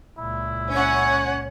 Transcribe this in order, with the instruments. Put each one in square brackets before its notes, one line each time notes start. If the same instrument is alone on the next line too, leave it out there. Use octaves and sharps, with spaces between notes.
[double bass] C#2 A#2 [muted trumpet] E4
[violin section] C#4 F#5 [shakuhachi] C#5